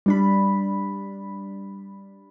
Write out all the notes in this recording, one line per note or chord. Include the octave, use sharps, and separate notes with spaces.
G3 D4 B5